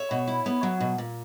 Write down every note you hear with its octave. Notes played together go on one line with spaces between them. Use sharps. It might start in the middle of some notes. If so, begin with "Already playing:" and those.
Already playing: C#5 E5
B2
E4
B3
F#3
B2
A#2